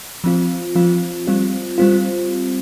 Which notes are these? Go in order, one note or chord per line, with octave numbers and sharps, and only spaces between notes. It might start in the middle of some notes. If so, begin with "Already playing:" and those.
F3 C4 F4
F3 C4 F4
G3 C4 F4
G3 C4 F4